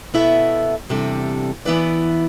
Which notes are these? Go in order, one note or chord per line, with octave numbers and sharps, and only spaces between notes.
B2 B3 E4 A4 E5
E2 C3 G3 D4 A4
E3 B3 E4 B4 D5